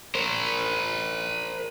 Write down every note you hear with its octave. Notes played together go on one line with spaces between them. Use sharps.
A#4 C5